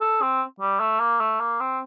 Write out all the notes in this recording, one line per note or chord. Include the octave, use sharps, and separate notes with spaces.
A4
C4
G3
A3
A#3
A3
A#3
C4